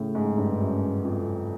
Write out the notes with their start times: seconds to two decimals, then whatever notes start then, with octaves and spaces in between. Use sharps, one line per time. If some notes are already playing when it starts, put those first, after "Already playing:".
Already playing: A2 C#3
0.15 G#2
0.38 G2
0.60 F#2
1.05 F2